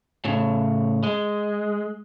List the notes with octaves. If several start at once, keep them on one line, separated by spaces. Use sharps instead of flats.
A2 C#3
G#3